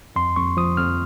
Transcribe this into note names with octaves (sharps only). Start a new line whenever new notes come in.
F2 C6
F2 C#6
F3 D#6
F2 F6